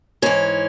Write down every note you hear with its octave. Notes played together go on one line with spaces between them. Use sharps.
G#2 E3 C#4